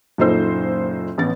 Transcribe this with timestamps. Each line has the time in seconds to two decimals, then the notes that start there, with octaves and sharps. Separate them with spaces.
0.18 F#1 A#2 D#4 A4 C5 E6
1.18 A1 B3 A6